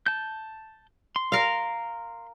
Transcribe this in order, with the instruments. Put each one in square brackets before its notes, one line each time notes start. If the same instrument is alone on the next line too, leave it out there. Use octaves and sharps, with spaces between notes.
[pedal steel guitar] A5 G6
C6
[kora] A#4 F5